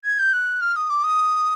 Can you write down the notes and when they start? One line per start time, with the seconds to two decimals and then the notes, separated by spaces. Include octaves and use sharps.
0.04 G#6
0.19 G6
0.33 F#6
0.61 F6
0.76 D#6
0.90 D6
1.04 D#6